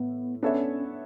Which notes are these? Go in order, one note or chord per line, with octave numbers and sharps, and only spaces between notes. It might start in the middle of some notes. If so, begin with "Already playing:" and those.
Already playing: A2 E3 A3 B3
B3 C#4 D4 A4 C#5 E5